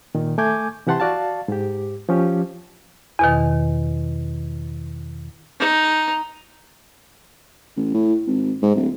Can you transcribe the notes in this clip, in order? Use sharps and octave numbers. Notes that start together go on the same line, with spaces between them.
A#2 D#3
A3 G#5 D6 G6 G#6
C3 E3 G4 F#5 A5 C6
F#4 D5 F5 A5
G#2 G4
F3 C#4 G4
E2 B2 D#3
D#4
A1
A2
G#1
G#2
D1